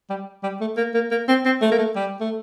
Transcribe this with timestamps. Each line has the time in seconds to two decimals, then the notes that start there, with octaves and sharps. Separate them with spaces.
0.10 G3
0.43 G3
0.61 A3
0.77 A#3
0.94 A#3
1.11 A#3
1.28 C4
1.45 C4
1.61 A3
1.71 A#3
1.79 A3
1.96 G3
2.20 A3